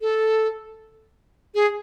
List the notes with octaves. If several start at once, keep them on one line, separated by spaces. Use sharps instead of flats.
A4
G#4